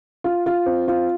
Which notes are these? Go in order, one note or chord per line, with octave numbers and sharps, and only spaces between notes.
F4
F4
C4
F4